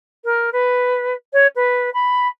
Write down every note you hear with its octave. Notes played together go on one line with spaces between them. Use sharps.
A#4
B4
C#5
B4
B5